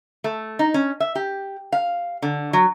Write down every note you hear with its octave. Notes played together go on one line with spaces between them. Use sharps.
A3
D#4
C#4
E5
G4
F5
D3
F#3